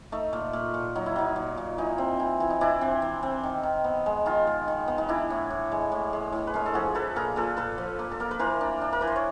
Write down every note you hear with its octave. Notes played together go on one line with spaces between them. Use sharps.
A3 D#4
A#2
A#2
A#2
F#3 D#4
E4
F#3 D#4
A#2
A#2
E3 D#4
C4
E3
E3
D#4
E3 D4 E4
C4
E3
C4
D#3
D#3
B3
G#3
D#3 D#4 F4
G#3
D#3
B3
D#4
E3 D4 E4
A2
A2
G#3
A2
G#3
A2
B4
G#3 A#4
A4
F3 F#4 G#4
F3 A4 B4
A#2 G#4 A#4
A#2 A4 B4
A#2 A4 B4
F3
A#3
A4
A#3 A#4
B4
E3 A#4 C5
D4
D4
A#4
E3 B4
C5
C#5